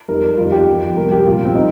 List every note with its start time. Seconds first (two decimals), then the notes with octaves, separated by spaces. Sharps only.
0.08 F2 D#3 G3 A#4
0.37 F2 D#3 G3 F4
0.52 G4
0.68 F2 F3
0.96 C2 C3 G3 A#4
1.12 G4
1.26 C2 A#2 F3 F4
1.45 C4
1.55 D#4